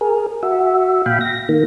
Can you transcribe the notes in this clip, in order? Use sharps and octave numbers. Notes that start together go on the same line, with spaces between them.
G#4 A#4
F#4 E5
A#2 F5 G5 B5
A#6
D#3 A#3